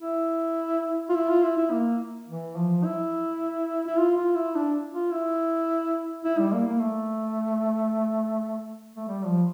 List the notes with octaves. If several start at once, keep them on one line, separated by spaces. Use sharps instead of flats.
E4
F4
E4
F4
E4
E4
A#3
E3
F3
E4
E4
F4
F4
E4
D4
F4
E4
E4
G3
A#3
A#3
A3
A3
G3
F3